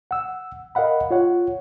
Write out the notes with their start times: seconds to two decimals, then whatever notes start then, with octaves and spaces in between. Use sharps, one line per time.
0.11 F#5 E6
0.75 A#4 D#5 F5 F#5 B5
1.11 F4 C#5 F#5